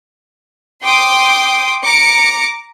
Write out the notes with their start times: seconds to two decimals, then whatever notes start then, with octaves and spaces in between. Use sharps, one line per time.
0.84 G5 C6 D6 D#6
1.84 A#5 D6 C#7